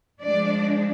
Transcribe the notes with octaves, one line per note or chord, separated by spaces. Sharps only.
F3 G#3 D4 D5